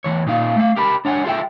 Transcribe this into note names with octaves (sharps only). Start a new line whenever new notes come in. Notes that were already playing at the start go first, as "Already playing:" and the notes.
E2 C#3 E3 C#5
A#2 D#4 F4 F5
A3 F5
G4 A#4 A5 B5
D4 C#5 F#5 G#5
F4 G#4 A4 E5 G5